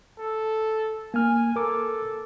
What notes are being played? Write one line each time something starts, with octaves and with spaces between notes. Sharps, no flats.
A4
A#3 G#5 F6
A4 A#4 D6